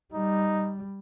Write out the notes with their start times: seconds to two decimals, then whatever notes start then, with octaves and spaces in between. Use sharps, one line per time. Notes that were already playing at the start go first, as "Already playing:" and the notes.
0.13 G3 D#4